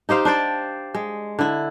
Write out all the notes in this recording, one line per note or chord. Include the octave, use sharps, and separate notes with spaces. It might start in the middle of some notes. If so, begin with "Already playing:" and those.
D#4 G4 C5 F5
D4 C5 D5 G5
G#3
D3 E4